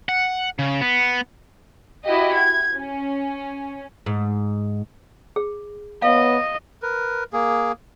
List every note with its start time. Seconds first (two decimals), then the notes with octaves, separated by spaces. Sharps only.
0.09 F#5
0.59 C#3
0.81 B3
2.05 E4 F#4 G4 D#5
2.36 G#6
2.75 C#4
4.06 G#2
5.36 G#4
6.02 B3 C#5 D#5 F5
6.82 A#4 B4
7.33 A#3 G#4